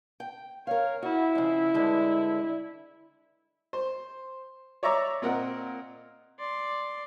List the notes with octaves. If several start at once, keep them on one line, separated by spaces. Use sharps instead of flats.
G5
A#4 C#5 F5
E4 F#4
F2 C#3
G2 D3 G#3
C5
C#5 D5 E5 A#5 C#6 D6
A#2 C4 A#4 D#5 F#5
D5 C6